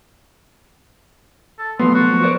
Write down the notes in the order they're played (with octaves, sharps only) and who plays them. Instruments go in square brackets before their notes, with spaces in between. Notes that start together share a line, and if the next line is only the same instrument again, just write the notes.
[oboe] A4
[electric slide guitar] F3 F#3 A3 [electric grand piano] B3 [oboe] C6
[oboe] F#4
[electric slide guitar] A#4 C5 D5